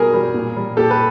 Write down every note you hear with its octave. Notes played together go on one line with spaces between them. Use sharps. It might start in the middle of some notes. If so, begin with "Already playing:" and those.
Already playing: B2 G3 G#4 A#4
G3
A#2
G3
A#2 G4 A4
B4